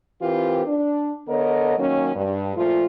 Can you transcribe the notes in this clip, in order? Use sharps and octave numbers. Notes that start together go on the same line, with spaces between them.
E3 C4 F4 G4 A#4 B4
D4
D3 B3 A4 A#4 C#5 D#5
D#3 F#3 A#3 C#4
G2
A#2 F3 A3 F4